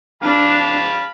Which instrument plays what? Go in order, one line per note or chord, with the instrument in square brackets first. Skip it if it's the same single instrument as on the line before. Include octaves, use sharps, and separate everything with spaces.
[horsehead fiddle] D4 [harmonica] F5 A5 B5